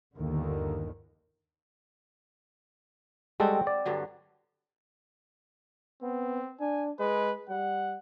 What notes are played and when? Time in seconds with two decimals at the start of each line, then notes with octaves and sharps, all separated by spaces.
0.16 G1 D#2 D3 D#3
3.40 G3 G#3 C4 F#4 A4
3.67 D5
3.86 G2 D3 F#3
6.02 B3 C4
6.60 D4 G#5
7.00 G#3 B4
7.49 G3 F#5